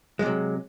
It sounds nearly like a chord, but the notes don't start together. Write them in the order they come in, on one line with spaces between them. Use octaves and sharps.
G#3 C3 F#3